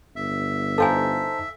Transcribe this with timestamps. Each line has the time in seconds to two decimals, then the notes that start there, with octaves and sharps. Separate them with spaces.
0.16 G1 E5
0.78 D#4 A4 C5 F5 G#5 A5